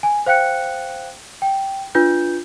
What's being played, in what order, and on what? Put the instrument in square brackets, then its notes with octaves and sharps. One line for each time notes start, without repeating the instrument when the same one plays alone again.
[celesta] G#5
C5 F5 G5 F#6 C#7
G5
D4 F4 B4 G6